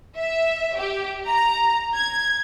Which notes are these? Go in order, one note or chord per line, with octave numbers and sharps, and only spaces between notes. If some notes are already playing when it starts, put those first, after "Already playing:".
E5
G4
A#5
G#6